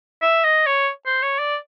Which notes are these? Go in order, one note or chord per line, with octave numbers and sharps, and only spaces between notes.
E5
D#5
C#5
C5
C#5
D5